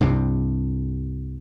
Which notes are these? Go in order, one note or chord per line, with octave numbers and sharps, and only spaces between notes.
C2 G2 C3